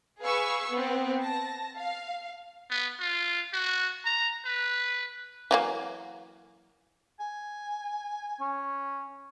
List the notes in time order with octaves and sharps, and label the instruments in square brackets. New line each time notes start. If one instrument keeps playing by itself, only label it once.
[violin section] G#4 B4 F5 C#6 E6
B3 C4
A5 A#6
F5
[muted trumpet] B3
F4
F#4
A#5
B4
[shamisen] E3 F#3 A#3
[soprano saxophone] G#5
[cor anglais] C#4